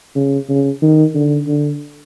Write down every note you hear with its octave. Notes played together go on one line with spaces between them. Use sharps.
C#3
C#3
D#3
D3
D3